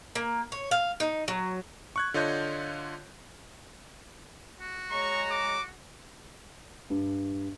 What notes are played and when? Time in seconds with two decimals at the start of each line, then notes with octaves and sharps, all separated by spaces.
0.15 A#3
0.52 C#5
0.71 F5
1.00 D#4
1.28 F#3
1.96 C#6 F#6 G#6
2.14 D3 F4 C#5 D#5 G6
4.60 F#4
4.91 G#3 C#5 A#5 C#6
5.31 D6
6.90 G2